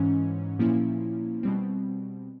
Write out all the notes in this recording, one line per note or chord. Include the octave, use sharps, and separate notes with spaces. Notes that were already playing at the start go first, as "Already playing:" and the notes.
Already playing: G#2 E3 C#4
A#2 F3 A#3 C#4 E4
B2 G3 C4